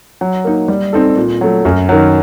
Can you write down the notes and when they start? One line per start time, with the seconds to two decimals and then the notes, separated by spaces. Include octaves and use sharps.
0.21 F#3
0.45 A#3 D#4
0.68 G3
0.93 C4 D#4 A4
1.16 A#2
1.41 F#3 A3
1.65 F#2
1.89 D#3 F#3